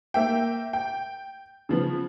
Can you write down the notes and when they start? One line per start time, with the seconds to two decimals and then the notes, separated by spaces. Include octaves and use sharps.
0.14 A#3 E5 G5
0.73 G5
1.69 C#3 F3 B3